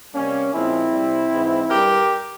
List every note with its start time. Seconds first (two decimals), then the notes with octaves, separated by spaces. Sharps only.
0.14 C3 G3 A#3 C#4
0.53 A#2 F3 G#3 C4 E4
0.92 C3 G3
1.32 G#2 E3 G#3
1.70 G2 G3 G4 A#4